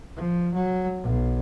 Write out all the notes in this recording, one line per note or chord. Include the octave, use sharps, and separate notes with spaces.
F3
F#3
B1